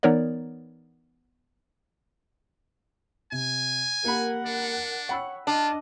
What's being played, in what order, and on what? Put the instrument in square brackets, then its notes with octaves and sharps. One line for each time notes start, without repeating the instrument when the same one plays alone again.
[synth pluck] E3 B3 D#4 A#4 C#5 D5
[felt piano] C3 [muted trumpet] G#5
[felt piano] A#3 G4 B5 [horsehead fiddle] A#4 F#5
[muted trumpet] D4
[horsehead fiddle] C#5 [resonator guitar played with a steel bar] F#5 [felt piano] G5 B5 E6
[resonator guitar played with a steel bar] D4 [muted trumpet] F4 [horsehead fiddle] D#5